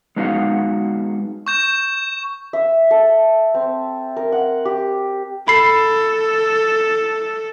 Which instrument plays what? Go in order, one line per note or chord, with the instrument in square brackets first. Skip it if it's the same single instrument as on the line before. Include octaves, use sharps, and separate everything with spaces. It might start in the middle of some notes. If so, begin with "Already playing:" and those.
[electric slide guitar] G#3 B3 D4 D#4 F#4 F5
[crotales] C#6 G6 E7
[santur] E5
A4
C4
A#4
F#5
G4
[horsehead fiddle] A4 [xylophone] B5 C7